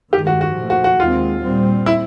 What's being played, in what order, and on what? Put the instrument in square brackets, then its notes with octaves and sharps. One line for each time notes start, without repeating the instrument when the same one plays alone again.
[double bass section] G2 D#3 G#3 [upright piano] G4
[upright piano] F#4
F#4
[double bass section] A#2 F3 A3
[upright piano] F#4
F#4
[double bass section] D#2 D#3 G#3 C4 [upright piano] F4
[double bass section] A#2 G3 C4
[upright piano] E4